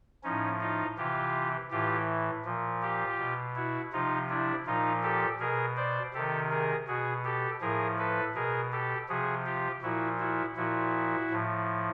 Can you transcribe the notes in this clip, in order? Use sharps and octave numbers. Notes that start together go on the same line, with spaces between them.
A2 F3 C#4 D#4
D#4 F4
C3 E3 F4 G4
A2 E3 F4 G4
A#2 F3
F4 G4
B2
E4 F#4
C3 F3 D#4 F4
D4 E4
A#2 F3 D#4 F4
G4 A4
B2 G#4 A#4
C5 D5
C3 D#3 G4 A4
G#4 A#4
B2 F#4 G#4
G4 A4
A2 F3 G#4 A#4
A4 B4
B2 G#4 A#4
G4 A4
C3 F3 F#4 G#4
F4 G4
A#2 F3 E4 F#4
E4 F#4
A#2 F3 E4 F#4
A2 F3